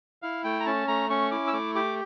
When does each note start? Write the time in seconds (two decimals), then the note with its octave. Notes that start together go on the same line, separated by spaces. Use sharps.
0.22 E4 F5
0.44 A3 G5
0.60 A#5
0.66 C#4 A5
0.88 A3 A#5
1.10 C#4 C#6
1.31 E4 D6
1.47 E6
1.53 A3 D6
1.75 G4 D6